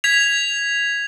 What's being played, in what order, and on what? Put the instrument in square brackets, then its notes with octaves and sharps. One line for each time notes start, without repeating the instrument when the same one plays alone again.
[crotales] G#6 B6 F7